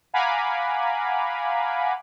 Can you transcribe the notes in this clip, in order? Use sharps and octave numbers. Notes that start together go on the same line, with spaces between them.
F5 F#5 G#5 A#5 B5 D6